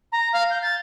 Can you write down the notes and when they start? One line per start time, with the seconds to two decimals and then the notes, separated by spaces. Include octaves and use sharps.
0.12 A#5
0.33 F5
0.50 G6
0.62 A6